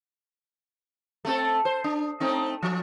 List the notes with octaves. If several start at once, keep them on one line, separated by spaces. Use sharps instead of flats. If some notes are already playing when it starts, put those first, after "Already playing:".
A3 C4 A4
C5
D4
A3 C4 D#4
F3